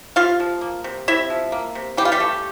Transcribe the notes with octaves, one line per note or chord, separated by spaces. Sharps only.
C3 F4 F5
F3
A#3
C3
C3 E4 E5
F3
A#3
C3
E3 G4
F4
G3 G4
A3